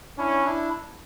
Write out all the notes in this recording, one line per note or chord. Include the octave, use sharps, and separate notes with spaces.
C#4 D4 E4
D4 E4